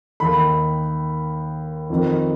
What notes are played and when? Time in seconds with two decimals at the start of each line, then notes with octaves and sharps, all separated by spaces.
0.20 D#2 D#3 B5
1.90 F2 D#3